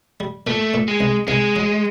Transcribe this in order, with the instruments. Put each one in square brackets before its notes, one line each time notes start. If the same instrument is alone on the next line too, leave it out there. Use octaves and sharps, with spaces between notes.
[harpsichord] G3
[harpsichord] A#2 [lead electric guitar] A3
[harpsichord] A#2
[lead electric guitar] G#3
[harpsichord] C2
[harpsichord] C2 [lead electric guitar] G#3
[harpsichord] F#3